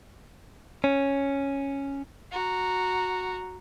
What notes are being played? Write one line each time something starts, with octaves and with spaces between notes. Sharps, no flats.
C#4
F#4 A#5